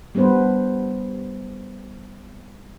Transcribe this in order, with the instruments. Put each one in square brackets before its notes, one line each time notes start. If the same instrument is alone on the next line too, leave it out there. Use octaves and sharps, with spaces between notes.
[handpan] G3 B3 D4 B4 C5